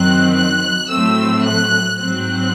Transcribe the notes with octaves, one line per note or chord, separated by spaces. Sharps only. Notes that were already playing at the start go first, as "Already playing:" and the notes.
Already playing: F#2 D#3 F#3 C4 F#6
F#6
A2 F#3 A3 C4 E6
F#6
G#2 F#3 C4 F#6